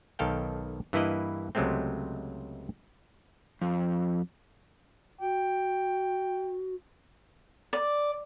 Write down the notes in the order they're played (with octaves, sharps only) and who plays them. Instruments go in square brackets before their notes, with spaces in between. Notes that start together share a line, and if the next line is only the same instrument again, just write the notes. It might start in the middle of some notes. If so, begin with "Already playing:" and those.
[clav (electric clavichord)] B1 D#3 A4 F5 G5
G2 E3 A#3 E4 B4 D#5
C#2 C3 F#3 G#3 A3 C4
[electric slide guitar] F2
[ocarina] F#4 [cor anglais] G5
[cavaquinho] D5